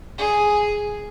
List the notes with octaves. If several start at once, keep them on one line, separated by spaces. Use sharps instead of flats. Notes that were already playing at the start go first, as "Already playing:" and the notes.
G#4